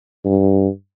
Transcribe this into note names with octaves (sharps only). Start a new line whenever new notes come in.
G2